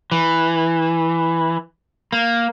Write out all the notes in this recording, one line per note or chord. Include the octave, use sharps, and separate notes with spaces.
E3
A#3